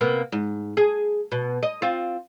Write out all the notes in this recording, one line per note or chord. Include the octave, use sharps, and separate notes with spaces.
C3 A#3 B3
G#2
G#4
B2
D#5
C4 F4